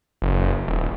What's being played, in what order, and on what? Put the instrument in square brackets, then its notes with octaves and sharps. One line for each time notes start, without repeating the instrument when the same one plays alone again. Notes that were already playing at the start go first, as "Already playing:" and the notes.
[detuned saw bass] F#1
D#1